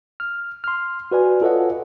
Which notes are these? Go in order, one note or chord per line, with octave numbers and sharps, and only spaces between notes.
F6
C6 F6
F#4 B4 D5 G#5
F4 A4 B4 C#5 D#5 F#5